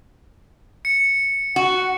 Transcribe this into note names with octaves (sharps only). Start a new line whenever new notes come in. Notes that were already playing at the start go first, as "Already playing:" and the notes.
C#7
F#4 F#5